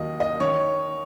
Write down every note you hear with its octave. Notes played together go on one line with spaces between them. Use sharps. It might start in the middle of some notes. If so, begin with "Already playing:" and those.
Already playing: D#2 D#3 F#3 D#5
D#5
D#3 C#5